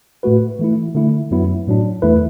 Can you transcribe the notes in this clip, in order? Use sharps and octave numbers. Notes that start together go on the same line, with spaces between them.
A2 A3 F#4 B4
E3 A3 E4
D3 A3 E4
F#2 F#3 B3 E4
A2 F#3 D4
E2 E3 A3 E4 B4